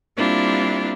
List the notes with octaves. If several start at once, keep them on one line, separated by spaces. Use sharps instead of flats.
G3 A#3 C4 D4 E4 F4